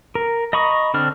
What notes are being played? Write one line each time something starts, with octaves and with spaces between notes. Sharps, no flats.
A#4
D#5 A#5 B5 C#6 D#6
D3 C4 D4 F6